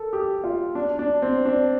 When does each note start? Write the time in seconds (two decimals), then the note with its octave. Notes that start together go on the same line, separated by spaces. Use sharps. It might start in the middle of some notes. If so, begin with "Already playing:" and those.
Already playing: A4 A#4
0.13 G4
0.44 F4
0.75 D4
0.99 D4
1.22 C4
1.45 D4